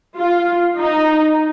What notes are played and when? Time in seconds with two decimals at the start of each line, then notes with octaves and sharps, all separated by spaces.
0.17 F4
0.77 D#4